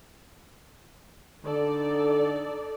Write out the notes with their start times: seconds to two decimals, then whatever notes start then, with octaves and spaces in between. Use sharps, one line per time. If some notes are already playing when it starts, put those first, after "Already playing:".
1.44 D3 D#4 A4 D5